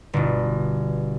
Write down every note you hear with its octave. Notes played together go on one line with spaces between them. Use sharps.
G1 B2